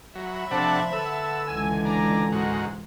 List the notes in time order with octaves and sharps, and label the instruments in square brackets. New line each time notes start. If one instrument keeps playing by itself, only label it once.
[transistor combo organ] F#3 [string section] E5 B5
[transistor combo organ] C3 D4 F#5 [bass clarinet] F3 [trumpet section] A3 A5
[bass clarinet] D3 [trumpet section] B4 F#5 A5 [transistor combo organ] E6
[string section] C#2 E3 [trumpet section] G#5
[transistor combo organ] D4 [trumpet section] G#5 A#5
[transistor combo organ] G#2 F#4 [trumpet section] A#4 C5 A#5